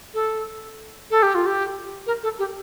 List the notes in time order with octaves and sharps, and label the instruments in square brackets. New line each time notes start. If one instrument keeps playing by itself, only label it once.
[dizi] A4
A4
G4
F4
G4
A#4
A4
G4